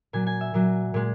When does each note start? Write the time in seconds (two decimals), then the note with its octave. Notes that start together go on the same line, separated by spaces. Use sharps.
0.13 A#2 F#3 G#5
0.27 G#5
0.41 E5
0.54 A#2 F#3
0.94 A#2 G#3